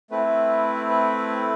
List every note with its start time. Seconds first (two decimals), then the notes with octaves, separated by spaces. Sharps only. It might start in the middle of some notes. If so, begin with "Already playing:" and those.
0.11 A3 C4 E4 B4
0.89 B4